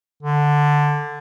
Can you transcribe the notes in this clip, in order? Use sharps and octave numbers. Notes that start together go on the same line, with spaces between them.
D3